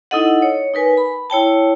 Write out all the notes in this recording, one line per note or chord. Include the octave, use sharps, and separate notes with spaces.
D#4 E4 A4 D#5 F#5
C#5
D#4 A#4 B4 G#5
B5
E4 C#5 G5 A5